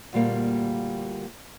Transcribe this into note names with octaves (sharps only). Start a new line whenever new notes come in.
D2 A#2 G3 A#3